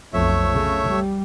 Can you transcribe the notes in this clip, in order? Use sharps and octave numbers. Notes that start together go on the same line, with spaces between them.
B1 F2 A3 C#5 E5
C#3
G3